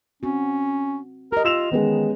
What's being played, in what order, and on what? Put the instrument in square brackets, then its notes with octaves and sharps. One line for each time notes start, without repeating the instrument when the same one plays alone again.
[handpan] C4 F#4 [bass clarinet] C#4
[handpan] G4 D#5 [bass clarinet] A#4
[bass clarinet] F4 [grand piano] E6 E7 F7
[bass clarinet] D#3 [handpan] E3 C#4 D#4 [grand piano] G#3 B3